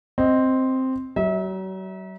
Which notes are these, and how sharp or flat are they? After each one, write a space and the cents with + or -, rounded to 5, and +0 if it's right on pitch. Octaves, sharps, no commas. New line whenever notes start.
C4 +0 D#5 +0
F#3 +40 E5 -35